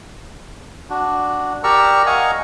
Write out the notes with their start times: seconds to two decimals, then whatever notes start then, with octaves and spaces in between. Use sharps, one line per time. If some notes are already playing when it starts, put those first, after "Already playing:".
0.90 D4 F#4
1.64 G4 A#4 D5 A#5 C#6 E6
2.06 D#5 F5 F#5 G#5 A#5 C#6